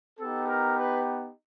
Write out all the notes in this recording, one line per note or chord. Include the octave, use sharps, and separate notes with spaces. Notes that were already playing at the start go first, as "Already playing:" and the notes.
B3 D#4 G4 A4
A#4
B4